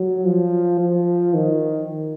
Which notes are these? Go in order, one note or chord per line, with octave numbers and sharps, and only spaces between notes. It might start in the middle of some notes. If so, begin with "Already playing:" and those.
Already playing: F#3
F3
F3
D#3